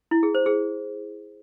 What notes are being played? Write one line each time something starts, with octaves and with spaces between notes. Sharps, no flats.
E4
G#4
C5
G#4